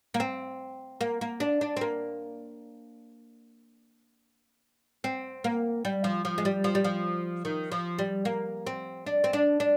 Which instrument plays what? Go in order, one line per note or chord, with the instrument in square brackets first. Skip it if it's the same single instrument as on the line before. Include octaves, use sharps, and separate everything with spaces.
[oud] A#3
C4
A#3
A#3
D4
D4
C4
A#3
C4
A#3
G3
F3
F3
G#3
G3
F3
G3
F3
D#3
F3
G3
A#3
C4
D4
C4
D4
D4